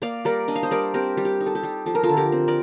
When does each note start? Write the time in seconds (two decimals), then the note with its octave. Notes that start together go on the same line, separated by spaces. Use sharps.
0.02 A#3 D5 F5
0.25 G3 A#4 D5
0.48 D4 D#5
0.55 F5
0.63 C5 D#5
0.71 G3 A#4 D5
0.94 C4 G4 A#4
1.17 G3
1.25 G4
1.40 D#4
1.46 A4
1.55 G4
1.63 G3
1.86 F3 A4
1.95 A#4
2.03 F4 A4
2.09 D3
2.17 G4 A#4
2.32 C4
2.48 A#4 D5